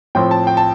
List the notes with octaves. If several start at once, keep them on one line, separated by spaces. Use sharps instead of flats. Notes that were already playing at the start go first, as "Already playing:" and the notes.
A2 F3 C4 G5
A5
G5
A5